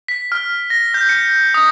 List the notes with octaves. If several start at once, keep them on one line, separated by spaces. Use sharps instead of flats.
B6
F6
A#6
G6
C#7
D#6